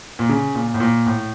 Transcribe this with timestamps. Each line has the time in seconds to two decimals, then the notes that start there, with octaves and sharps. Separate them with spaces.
0.19 A#2
0.29 C#3
0.55 A#2
0.74 A2
0.80 A#2
1.06 A2